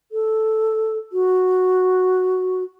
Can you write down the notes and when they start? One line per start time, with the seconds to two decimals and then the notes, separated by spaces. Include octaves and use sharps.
0.12 A4
1.12 F#4